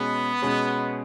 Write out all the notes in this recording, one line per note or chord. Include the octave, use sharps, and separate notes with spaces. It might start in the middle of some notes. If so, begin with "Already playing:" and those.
Already playing: B2 G#3 B3 C#4 G#4
B2 G#3 C#4 G#4